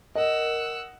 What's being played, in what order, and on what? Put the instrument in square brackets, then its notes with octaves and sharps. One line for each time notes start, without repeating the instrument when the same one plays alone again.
[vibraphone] A#4 [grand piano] D#5 [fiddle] F#5 E6